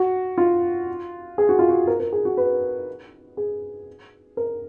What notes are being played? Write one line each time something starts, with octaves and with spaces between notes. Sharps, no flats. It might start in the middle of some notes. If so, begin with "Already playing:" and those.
Already playing: F#4
F4
G#4
F#4
F4
F#4
A#4
A#4
G#4
F#4
B4
G#4
A#4